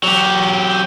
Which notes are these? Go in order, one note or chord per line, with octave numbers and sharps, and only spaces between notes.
F#3 G4